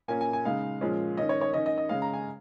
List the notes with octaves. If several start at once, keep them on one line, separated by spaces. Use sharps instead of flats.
A#2 A#3 C#4 G#5
G#5
G#5
C#3 G#3 D#4 F5
A#2 F3 G#3 C#4
D#3 C#4 D#5
C#5
C#5
D#3 C#4 D#5
D#5
D#5
C#3 G#3 C#4 F5
A#5
G#5